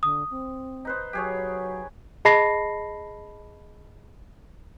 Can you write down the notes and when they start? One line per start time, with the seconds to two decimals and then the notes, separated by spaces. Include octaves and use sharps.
0.03 D3 D#6
0.30 C4
0.85 D#4 B4 C5
1.13 F#3 G4 G#4 C#5
2.25 G#4 D#5 A5 B5 A#6 C7